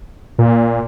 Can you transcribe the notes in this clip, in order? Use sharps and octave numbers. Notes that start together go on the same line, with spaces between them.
A#2